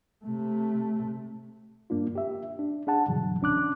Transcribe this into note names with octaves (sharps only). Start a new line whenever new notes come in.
C3 A3
G2 A#3 D4 F4
G4 E5
D4
D4 G#4 F#5 A5
G2 B2 D3 E3 F#3
C2 C#4 D4 D6 F#6